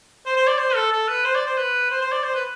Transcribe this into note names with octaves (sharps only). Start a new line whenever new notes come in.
C5
C5
D5
C5
A4
A4
B4
C5
D5
C5
B4
C5
C5
D5
C5
B4